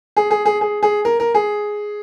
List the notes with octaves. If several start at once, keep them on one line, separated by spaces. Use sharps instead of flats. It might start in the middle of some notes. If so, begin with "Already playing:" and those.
G#4
G#4
G#4
G#4
G#4
A#4
A#4
G#4